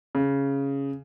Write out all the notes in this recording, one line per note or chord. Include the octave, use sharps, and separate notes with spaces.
C#3